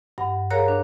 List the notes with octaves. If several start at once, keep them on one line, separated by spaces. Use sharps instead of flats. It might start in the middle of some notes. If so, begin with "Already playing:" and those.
G2 F#5 B5
G#4 A#4 C#5 F5 A#5 F#6
D4